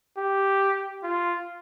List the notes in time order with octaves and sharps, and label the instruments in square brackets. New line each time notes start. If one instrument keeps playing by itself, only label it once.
[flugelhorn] G4
F4